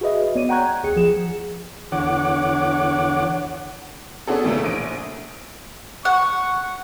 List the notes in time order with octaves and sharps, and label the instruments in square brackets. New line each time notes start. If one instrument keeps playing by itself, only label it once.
[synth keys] F#4 G#4 B4 D#5 E5
G1 B3 C#5 D5 D#7
F#5 G5 A#5 C#6 F#6 G#6
D2 G#4 C#7
F3 G#4 E7
[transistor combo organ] E2 D3 C#5 F#5 D6
[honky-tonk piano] B3 C#4 D4 F#4 G#4 A4
E2 A2 C#3 A3 A#3
A#1 D7
[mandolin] F#5 [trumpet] C#6